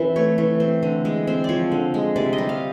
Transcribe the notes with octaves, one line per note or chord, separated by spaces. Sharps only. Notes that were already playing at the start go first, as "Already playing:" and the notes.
Already playing: E3 C4
A3 C#5
E3
C4
D3
G#3
C4
F3 C#5 D5
D3
G#3
C3 D5
D#5
G3
F5